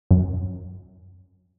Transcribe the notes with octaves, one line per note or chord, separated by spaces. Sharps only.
F#2